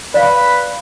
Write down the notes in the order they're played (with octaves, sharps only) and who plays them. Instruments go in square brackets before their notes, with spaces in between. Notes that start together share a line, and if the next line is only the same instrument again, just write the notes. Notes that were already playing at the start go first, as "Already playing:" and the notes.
[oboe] B4 [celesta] D5 F5